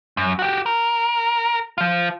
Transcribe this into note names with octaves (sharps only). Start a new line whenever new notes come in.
F#2
F#4 G4
A#4
F3 F4